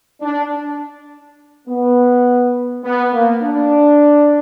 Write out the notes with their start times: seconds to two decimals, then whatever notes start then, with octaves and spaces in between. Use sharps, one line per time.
0.21 D4
1.67 B3
2.84 B3
3.13 A#3
3.42 D4